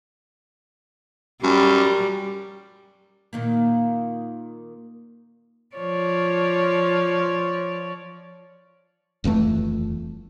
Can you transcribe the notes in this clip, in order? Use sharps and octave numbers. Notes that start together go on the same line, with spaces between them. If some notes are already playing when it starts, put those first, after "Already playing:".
F#2 G3
A#2 D#3 A#3
F3 C#5 D5
D#1 F2 E3 A3